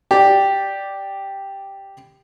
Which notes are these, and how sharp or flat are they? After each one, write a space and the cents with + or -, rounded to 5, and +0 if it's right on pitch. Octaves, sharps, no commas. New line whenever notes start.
G4 +0 D5 +0 G5 +0